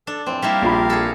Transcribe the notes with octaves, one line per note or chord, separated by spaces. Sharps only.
D4 A4
F2 A2 E3 C4
G3 A#3 E4 G4 A#4 F5
A#1 F4 B5
G#4 A4